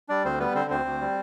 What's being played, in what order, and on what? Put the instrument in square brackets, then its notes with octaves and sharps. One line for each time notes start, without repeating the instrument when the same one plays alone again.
[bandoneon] G3 D4 D5
D2 C4 C5
G3 B3 B4
D3 C4 C5
D2 C4 C5
D2
G3